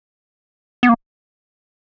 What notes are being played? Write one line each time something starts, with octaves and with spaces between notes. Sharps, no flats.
B3
A#3